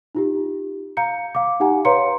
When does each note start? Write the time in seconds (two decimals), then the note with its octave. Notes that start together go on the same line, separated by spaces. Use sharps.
0.15 D#4 F4 G4
0.97 F5 A#5 G6 C#7
1.35 F5 D6
1.60 D#4 G4 F#5 G#5 A#5
1.85 B4 C#5 F5 A#5 C6 C#7